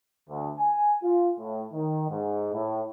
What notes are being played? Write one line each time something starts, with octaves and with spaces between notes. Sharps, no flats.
D2
G#5
F4
A2
D#3
G#2
A2